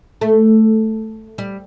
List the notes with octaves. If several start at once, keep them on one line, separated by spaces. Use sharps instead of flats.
A3
G3